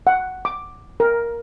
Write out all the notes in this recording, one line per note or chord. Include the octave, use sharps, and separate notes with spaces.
F#5
D6
A#4